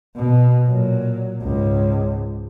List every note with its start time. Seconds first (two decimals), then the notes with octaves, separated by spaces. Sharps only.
0.16 B2
0.68 A#2 F#3
1.42 C#2 G#2